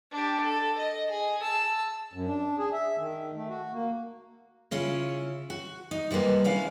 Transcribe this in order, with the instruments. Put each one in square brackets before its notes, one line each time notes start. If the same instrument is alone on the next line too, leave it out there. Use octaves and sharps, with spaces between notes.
[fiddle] D4 G4
A4
D#5
G#4
A5 E6
[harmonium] F#2
D4
G#4
E5
D#3
A3
F#4
A#3
[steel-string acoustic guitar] C#3 C#4 E4 F4
F#4
D#4
C3 G3 G#3 A#3 B3
D2 C#4 D4 E4 F5